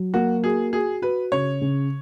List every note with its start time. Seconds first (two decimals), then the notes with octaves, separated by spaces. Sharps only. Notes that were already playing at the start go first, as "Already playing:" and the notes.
Already playing: F#3
0.14 A#3 F#4
0.43 F#4 G#4
0.73 F#4 G#4
1.02 F#4 B4
1.32 C#3 C#5
1.61 C#3